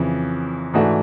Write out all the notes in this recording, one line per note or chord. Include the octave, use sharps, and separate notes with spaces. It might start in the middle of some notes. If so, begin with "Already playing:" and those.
Already playing: F2 C#3 E3
G#2 E3 A3 D4 F#4